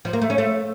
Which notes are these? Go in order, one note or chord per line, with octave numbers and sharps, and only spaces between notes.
F3
A#3
A3
C#4
A3